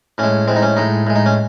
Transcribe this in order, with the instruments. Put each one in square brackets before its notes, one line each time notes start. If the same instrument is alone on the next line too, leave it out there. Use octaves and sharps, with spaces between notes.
[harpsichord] A2 G#3 C#4
A2 G#3 C4
D#4
C#4
A2 G#3 D#4
A2 G#3
D#4
C#4